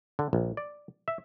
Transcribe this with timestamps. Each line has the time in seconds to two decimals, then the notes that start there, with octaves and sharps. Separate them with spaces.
0.19 D3
0.33 A#1
0.57 D5
1.08 E5